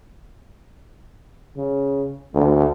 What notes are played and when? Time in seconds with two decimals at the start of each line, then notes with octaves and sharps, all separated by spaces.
1.57 C#3
2.35 D2 A3